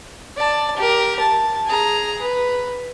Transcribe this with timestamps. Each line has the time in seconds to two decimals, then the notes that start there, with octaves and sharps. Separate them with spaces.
0.36 D5 A5
0.77 G4 A#4
1.19 A5
1.66 G#4 A#5
2.21 B4